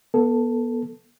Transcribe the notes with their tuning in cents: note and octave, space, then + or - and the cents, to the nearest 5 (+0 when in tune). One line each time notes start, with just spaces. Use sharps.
B3 -30 A4 +0